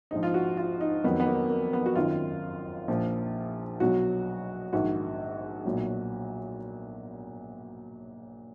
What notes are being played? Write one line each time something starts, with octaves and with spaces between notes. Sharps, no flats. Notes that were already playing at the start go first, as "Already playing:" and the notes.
A#1 G#2 F3 D#4
F4
F#4
F4
D#4
F2 D#3 F#3 B3
B3
A#3
A#3
B3
F#4
G#1 F#2 D#3 F4
A#1 A#2 F3
B1 B2 F#3 F#4
A#1 G#2 D#3 F#4
B1 A#2 F#3